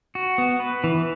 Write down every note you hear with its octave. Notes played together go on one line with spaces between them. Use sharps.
F#4
B3
B4
E3